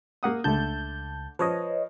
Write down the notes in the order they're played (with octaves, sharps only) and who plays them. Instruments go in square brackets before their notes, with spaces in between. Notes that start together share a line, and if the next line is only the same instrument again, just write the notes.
[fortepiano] A#3 F#5 D#6
[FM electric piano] C#2 A5 G6 [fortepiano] D3 A3
[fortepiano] F3 [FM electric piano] B4 C#5 D#5